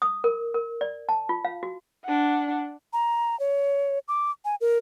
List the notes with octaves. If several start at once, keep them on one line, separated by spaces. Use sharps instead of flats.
D#6
A#4
A#4
D5
A5
F4
F5
F#4
D4 F#5
A#5
C#5
D6
G#5
A#4